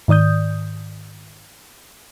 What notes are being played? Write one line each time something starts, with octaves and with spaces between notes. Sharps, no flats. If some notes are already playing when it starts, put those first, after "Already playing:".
G#2 D#3 D5 D#6 G6